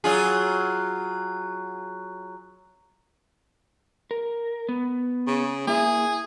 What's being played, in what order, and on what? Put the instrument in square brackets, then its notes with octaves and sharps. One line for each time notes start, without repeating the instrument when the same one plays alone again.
[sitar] F#3 F4 G#4
[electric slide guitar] A#4
B3
[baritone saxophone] C#3
[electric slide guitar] A#3 E4 E5 [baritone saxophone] G#4